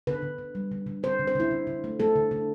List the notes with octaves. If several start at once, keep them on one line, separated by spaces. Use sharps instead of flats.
D3 B4
D3
D3
G3
D3
D3
D3 C5
D3
C5
D3 E4
D3
D3
A3
A3 A4
D3
D3